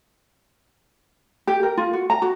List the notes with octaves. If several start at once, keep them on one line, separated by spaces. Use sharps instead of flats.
G4
A#4
F4
F#4
A#5
F#4